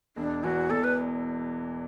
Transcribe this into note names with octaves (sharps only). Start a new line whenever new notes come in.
E1 D4
E2 E3 F#4
E1 A4
B4